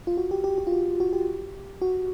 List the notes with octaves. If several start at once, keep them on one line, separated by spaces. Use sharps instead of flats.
F4
F#4
G4
G4
G4
F4
F#4
F#4
G4
F#4